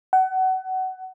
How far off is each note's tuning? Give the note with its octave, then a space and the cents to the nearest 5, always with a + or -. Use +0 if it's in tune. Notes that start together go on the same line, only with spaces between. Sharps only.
F#5 +25